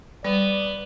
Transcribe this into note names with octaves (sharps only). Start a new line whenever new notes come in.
G3 B3 D5